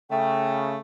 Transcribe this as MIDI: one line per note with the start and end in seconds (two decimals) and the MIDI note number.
0.11 0.77 49
0.11 0.77 57
0.11 0.59 79